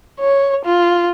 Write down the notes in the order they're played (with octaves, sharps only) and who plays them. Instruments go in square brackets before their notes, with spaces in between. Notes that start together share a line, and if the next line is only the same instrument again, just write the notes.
[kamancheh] C#5
F4